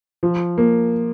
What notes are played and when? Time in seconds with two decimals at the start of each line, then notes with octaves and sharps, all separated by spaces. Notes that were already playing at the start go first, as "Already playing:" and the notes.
0.23 F3
0.58 A#3